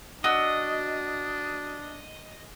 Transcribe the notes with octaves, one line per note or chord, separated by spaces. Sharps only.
D4 F#4 D#5 E6